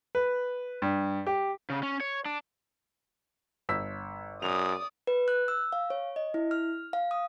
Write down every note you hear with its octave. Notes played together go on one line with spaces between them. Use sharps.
B4
G2
G4
C#3
C#4
C#5
D4
G1 E6 B6
F#2 D5 D#6 F7
B4
F#6
E6
F5
C#5
D#5
E4
F6
F5
D#6